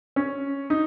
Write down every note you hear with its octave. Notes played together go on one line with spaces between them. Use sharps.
C#4
D#4